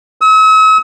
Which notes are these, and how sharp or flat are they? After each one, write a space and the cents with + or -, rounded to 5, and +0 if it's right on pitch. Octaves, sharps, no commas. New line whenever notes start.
E6 -45